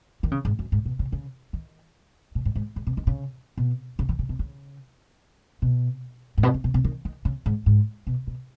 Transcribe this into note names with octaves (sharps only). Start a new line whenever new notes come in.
D#3
C#3
G#2
F#2
G#2
B2
C#3
C#3
D#3
B2
G#2
G#2
G#2
B2
D#3
C#3
B2
C#3
D#3
C#3
B2
C#3
B2
G#2
B2
C#3
B2
B2
D#3
D#3
C#3
G#2
G#2
B2
B2